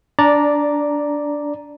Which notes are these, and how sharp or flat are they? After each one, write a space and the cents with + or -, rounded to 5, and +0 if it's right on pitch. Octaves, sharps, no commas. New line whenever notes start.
D4 -15 D5 +0 A#5 +0